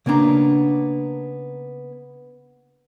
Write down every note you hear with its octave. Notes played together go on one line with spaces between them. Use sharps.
C#3 A#3 B3 D4 A#5